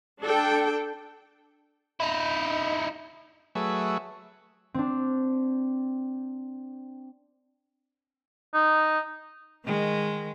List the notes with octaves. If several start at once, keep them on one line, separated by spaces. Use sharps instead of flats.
D4 A4 G5
D#4 E4
F#3 A3 G#4 B4 C#5 E5
C4 D4
D#4
D#3 G#3